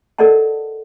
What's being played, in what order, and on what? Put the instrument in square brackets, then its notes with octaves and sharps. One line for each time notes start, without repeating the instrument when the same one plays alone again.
[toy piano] A4 A#4 D5 D#5 F#5 A5